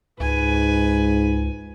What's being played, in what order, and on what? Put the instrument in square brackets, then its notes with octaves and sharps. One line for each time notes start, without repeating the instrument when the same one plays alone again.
[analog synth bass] C#2 [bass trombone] G#2 [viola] B4 G#5